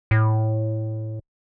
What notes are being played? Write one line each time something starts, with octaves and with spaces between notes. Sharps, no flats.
A2